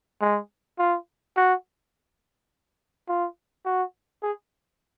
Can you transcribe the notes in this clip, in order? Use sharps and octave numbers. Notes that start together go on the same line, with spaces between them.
G#3
F4
F#4
F4
F#4
G#4